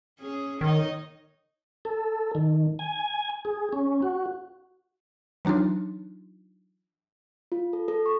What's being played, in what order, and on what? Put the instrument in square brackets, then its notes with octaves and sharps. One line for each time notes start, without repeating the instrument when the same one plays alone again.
[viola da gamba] C#4 G#4
[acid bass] D#3 [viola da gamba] D#4 C#5 D#5
[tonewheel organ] A4
D#3
G#5
G#4
C#4
F#4
[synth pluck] E3 F#3 D4 D#4 F4
[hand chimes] F4
A4
A4
C#6